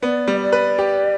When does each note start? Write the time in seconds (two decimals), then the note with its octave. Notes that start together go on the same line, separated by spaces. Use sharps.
0.02 B3 D5
0.27 G3
0.41 D5
0.52 B4
0.79 G4